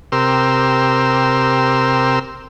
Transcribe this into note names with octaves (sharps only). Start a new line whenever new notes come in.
C3 G4 A#4 C6 E6